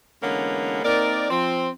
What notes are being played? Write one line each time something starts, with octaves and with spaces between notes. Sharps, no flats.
D3 E3 G#3 A#3 B3 C#4
A#3 C4 D#4 A#4 D5
F3 C4